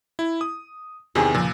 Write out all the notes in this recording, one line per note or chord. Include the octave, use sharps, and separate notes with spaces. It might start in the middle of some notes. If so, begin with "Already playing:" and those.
E4
D#6
E2 C3 D#3 G4 G#4
A#2 C#3 F3